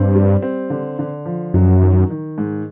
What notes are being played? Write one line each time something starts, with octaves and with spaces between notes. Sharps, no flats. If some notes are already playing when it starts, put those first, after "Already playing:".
Already playing: G2 C4
G3
C4
D3
D3
F3
F#2 F#3
D#3
D#3
G#2